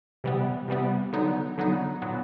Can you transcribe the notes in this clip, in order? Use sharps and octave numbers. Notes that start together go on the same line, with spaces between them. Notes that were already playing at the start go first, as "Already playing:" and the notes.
C3 E3 G3 B3
C3 E3 G3 B3
D3 F#3 B3 D#4
D3 F#3 B3 D#4
A#2 F#3 B3